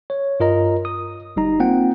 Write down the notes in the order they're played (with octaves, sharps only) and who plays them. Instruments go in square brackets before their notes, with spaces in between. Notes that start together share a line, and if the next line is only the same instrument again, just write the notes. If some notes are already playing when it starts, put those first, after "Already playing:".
[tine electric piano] C#5
G2 F4 A#4 D#5 A#5
D#6
G1 G3 D#4 A#5
A#3 C4 F4 F#5 G5